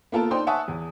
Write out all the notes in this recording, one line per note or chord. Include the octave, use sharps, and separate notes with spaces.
A#3 B3 F4 A4 A#4 A5
D#4 C5 D5 G5 C6
E5 F#5 G#5 A5 C#6 D#6
E2